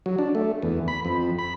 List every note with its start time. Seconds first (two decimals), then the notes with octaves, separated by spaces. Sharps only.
0.06 F#3
0.19 D4
0.35 A3
0.62 E2
0.88 B5
1.05 F2
1.39 B5